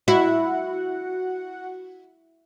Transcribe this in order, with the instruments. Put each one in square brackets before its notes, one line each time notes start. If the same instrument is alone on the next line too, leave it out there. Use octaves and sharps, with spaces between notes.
[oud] E4 [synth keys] F#4 F#5